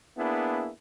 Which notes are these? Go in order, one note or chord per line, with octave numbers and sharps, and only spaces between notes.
A#3 B3 D4 E4 G#4